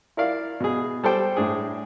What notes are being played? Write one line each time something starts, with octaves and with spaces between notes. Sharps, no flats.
E4 A#4 D5 F5
B2 G#4
G3 A4 C5 G5
A2 D4 G#4